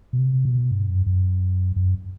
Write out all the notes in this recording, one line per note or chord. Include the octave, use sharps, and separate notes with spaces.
B2
C3
B2
G2
F#2
F#2
F#2